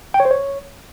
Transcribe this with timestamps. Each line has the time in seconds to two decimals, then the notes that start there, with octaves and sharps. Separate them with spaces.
0.14 G5
0.20 C#5
0.25 C5
0.31 C#5